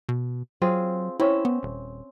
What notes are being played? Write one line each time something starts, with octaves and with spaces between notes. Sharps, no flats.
B2
F#3 C4 F4 G#4
C4 C#4 E4 E5
B3
D#1